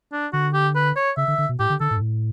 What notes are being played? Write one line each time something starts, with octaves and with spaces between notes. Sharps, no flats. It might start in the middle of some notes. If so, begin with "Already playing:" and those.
D4
D3 F#4
G4
B4
C#5
C#3 E5
D3
D3
B2
A2 G4
D3
D3 A4
A2
G2
A2